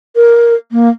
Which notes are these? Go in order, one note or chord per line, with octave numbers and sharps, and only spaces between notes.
A#4
A#3